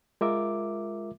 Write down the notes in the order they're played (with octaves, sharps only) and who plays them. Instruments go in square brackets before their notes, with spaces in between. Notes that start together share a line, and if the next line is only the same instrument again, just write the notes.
[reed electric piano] G#3 F4 A#4 E5 D6